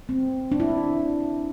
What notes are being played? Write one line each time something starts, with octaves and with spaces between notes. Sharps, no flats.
C4
D4
E4